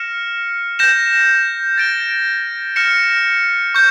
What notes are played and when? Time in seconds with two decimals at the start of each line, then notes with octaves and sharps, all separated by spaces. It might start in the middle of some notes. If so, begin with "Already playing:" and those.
Already playing: F6 A#6 C#7 E7
0.79 G6 A#6 E7
1.78 A6 D7 G7
2.76 F6 A#6 C#7 E7
3.75 C#6 G6